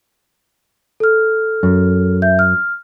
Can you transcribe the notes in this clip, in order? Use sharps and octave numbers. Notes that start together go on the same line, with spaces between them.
A4 F6
F#2
E5 G6
F6